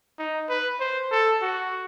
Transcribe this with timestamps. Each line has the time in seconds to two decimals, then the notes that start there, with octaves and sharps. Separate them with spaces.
0.18 D#4
0.49 B4
0.80 C5
1.11 A4
1.42 F#4